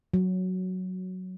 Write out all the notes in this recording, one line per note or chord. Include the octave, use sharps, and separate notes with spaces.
F#3